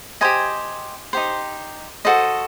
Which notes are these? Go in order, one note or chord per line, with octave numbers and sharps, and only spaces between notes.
G4 C5 D#5 G#5
D#4 G4 C5
F#4 A4 C5 D#5